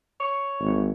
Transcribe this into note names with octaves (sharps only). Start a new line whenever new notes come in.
C#5
G#1